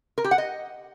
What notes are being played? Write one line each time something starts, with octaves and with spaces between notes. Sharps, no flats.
A#4
G4
F#5
D#5